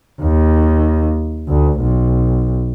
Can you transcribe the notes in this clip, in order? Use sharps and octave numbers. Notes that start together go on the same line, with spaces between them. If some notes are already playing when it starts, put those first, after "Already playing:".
D#2
D2
B1